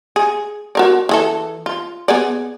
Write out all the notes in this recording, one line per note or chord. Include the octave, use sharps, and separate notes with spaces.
G#4
F#4 A#4 D5
E3 G#4 A4
F4
B3 G#4 D5